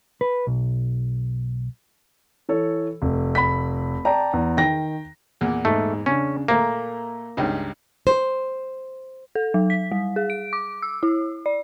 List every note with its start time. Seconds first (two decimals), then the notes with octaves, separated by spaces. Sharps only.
0.21 B4
0.47 B1
2.49 E3 A4 C#5
3.02 F1
3.35 B5 B6
4.05 D5 G5 A5 A#5
4.33 E2
4.57 D#3 G5 A#6
5.41 E2 A#2 F#5
5.65 G#2 A3
6.06 C#3 C#4 D4
6.48 A#2 A3 A#3 A#5
7.37 C#2 G2 D#4
8.07 C5
9.35 A4
9.54 F#3
9.70 B6
9.91 G3
10.16 G#4
10.30 D7
10.53 D6
10.82 E6
11.03 E4
11.46 D5